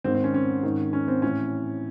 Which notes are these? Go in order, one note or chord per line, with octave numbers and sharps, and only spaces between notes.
G#2 D#3 C4
C4
C#4
C#4
G#2 D#3
C#4
C4
A2 E3 C#4